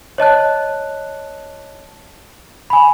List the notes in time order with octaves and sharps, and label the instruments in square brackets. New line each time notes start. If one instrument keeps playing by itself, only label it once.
[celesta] C#5 D#5 A5 F#6
G#5 B5